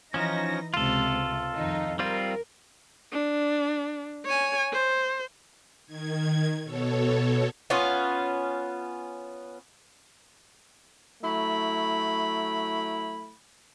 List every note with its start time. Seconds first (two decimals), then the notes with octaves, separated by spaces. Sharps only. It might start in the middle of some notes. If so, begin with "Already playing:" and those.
0.14 E3 F3 C#4 D#4 A#6
0.74 C#2 C3 F4 A4
1.55 F2 D#3 D#4
1.99 G3 C4 F4 A#4
3.12 D4
4.25 C#5 G#5
4.72 C5
5.86 D#3 G#6
6.63 B2 A4 C#5
7.70 B3 C#4 F4
11.23 F#3 A3 E4 B5